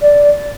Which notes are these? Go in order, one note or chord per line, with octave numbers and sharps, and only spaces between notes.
D5